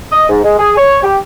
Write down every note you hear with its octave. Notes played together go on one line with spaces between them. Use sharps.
D#5
G#2
G#3
G#4
C#5
G4